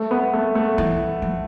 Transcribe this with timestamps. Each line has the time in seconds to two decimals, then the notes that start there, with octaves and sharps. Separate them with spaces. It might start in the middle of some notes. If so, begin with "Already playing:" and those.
Already playing: A3
0.11 B3
0.33 A3
0.55 A3
0.78 E3
1.22 F3